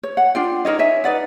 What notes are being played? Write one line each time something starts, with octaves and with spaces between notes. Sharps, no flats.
C#5
F#5
D4 F4 G5
D#4 A#4 C#5 D#5
C#5 E5 G#5
D#4 B4 D5 F#5